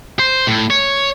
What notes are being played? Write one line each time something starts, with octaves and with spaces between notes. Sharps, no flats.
C5
A2
C#5